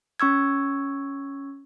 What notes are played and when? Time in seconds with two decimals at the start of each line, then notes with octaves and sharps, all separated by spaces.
0.20 C#4 C#6 E6 G#6